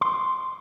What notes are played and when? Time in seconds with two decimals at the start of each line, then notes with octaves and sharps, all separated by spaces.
0.01 C6